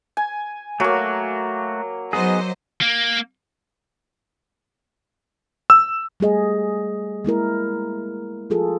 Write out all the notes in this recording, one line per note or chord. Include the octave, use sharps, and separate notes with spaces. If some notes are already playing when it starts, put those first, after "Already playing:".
G#5
F#3 A3 A#3 F#4
F#3 B3 D#4 G#4 C5 D#5
A#3
E6
G3 A3 G#4 D#5
G#3 A#3 E4 A#4
F3 F4 G#4 A4